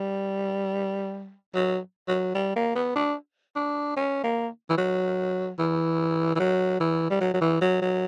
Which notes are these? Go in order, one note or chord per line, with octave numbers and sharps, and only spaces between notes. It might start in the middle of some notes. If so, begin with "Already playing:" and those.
Already playing: G3
F#3
F#3
G3
A#3
B3
D4
D4
C#4
A#3
E3
F#3
E3
E3
F#3
E3
G3
F#3
F#3
E3
F#3
F#3